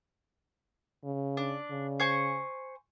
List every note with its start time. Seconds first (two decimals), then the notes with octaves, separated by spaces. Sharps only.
1.04 C#3
1.37 D4
1.71 C#3
2.00 C5 G#5 C#6